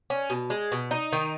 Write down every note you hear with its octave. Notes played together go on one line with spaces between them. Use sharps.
C#4
B2
G#3
B2
D#4
D#3